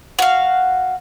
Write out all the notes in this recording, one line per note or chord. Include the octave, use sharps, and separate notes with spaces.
F#4 F5